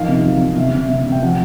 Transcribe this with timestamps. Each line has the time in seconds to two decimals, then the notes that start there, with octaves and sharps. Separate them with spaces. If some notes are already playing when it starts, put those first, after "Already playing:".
Already playing: D#3 F3 F5
0.08 C3
0.24 F#3
0.42 C3
0.57 C3 E5
0.74 C3
0.90 C3 E5
1.06 C3
1.12 G5
1.22 F3 F#5